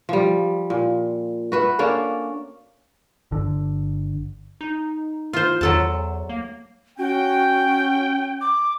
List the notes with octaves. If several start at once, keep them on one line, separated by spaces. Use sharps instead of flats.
F3 G3
A#2
F#4 B4 E5
A#3 C#4 D4 A4
G1 D3
D#4
F4 C5
E2 F#3 A4 A5
A#3
C#4 F#4 G5
D6